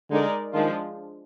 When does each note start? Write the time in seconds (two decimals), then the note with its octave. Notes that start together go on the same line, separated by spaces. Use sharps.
0.10 D3 G#3 D#4 A#4 D5
0.53 D#3 F3 G#3 D4 F4